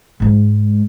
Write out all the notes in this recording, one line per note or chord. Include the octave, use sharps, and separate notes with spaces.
G#2 G#3